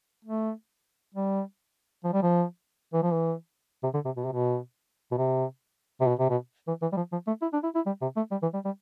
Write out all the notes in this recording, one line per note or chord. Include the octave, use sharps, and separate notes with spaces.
A3
G3
F3
G3
F3
E3
F3
E3
C3
D3
C3
B2
C3
B2
B2
C3
C3
B2
C3
B2
E3
E3
G3
F3
F3
A3
E4
D4
E4
E4
G3
C3
A3
G3
E3
G3
G3